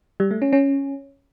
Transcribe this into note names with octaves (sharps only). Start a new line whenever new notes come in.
G3
A3
C#4
C#4